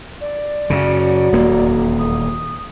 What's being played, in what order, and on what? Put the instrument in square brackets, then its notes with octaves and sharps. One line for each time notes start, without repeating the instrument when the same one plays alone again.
[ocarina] D5
[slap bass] F#2 C#3 [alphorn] F#3
[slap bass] D#1 E2 A#3
[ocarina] D#6